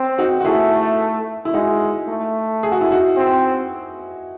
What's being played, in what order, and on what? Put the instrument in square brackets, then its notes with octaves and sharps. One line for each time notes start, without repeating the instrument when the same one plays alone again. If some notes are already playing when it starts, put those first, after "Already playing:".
Already playing: [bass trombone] C4
[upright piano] D#4 F#4
F#4
[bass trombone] A3 [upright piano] E4 G#4
[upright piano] E4
[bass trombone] G#3 [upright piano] D#4 F#4
[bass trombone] A3
[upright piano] G#4
F#4
E4
D#4 F#4
[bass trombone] C4